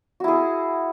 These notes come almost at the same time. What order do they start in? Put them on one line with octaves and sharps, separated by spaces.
F#4 E4 G#4